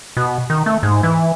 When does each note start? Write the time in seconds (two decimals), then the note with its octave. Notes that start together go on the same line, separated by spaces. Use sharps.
0.17 B2
0.50 D#3
0.66 A3
0.83 G#2
1.03 E3